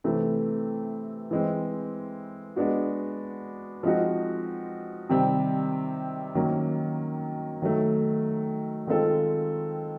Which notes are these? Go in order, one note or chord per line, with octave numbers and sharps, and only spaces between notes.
C3 E3 A3 C4
E3 G#3 C4
G#3 B3 D4 F#4
F3 G#3 C4 D#4 F#4
C3 D#3 G3 C4
D#3 F#3 A#3 C#4
D#3 F#3 A3
D#3 G#3 C4 F4 A4